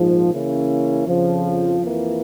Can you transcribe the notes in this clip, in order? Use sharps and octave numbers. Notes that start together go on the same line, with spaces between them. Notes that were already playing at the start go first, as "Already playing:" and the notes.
Already playing: A#1 G#2 F3
C#3 E3 A#3 C#4 E4
F2 C#3 F3
F2 E3 A#3